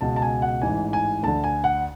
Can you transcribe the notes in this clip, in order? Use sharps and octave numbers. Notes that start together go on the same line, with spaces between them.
C#2 B2 A5
A5
G#5
F#5
A1 G#2 E3 G#5
G#5
D2 D3 A5
G#5
F#5